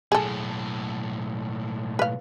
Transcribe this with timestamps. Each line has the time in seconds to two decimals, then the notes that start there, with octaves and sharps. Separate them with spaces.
0.12 B1 A2 G#4 A4
1.99 B4 F5